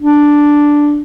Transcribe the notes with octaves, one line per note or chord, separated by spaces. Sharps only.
D4